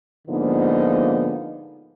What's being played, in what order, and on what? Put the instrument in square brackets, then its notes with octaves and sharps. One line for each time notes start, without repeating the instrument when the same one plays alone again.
[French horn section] G#2 D3 F3 A#3 B3 D#4